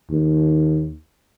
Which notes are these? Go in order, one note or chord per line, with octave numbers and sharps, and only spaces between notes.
D#2